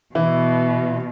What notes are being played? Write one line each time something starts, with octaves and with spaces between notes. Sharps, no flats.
B2 E3 E4